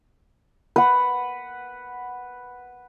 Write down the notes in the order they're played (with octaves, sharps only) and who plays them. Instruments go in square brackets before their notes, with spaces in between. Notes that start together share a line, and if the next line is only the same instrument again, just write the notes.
[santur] B4 F#5